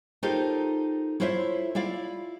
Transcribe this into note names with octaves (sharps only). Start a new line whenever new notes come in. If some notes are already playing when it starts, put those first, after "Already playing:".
D#4 F4 G4 A4 A#4 C5
E4 F4 A4 C5 C#5 E5
E4 F4 D5 F5